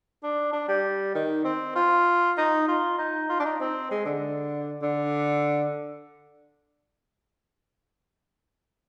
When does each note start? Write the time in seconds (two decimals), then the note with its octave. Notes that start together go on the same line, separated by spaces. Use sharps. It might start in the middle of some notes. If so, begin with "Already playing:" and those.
0.23 D4
0.53 D4
0.68 G3
1.15 D#3
1.45 C4
1.75 F4
2.38 D#4
2.68 F4
2.98 D#4
3.29 F4
3.40 D4
3.45 D#4
3.60 C4
3.91 G#3
4.05 D3
4.82 D3